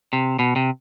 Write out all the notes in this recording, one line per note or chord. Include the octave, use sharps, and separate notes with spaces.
C3
B2
C3